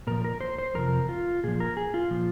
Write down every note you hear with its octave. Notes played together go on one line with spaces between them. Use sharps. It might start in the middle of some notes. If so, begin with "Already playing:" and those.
A#2 F3 A#4
A#4
C5
C5
F2 C3 F3 A#4
F4
A#2 F3 G#4
A#4
G#4
F4
A#2 F3